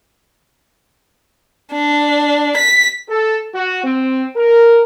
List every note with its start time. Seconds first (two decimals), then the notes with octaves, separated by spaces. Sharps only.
1.72 D4
2.57 B6
3.09 A4
3.55 F#4
3.84 C4
4.36 A#4